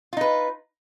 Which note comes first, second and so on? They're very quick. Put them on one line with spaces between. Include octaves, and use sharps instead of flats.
F4 D#4 B4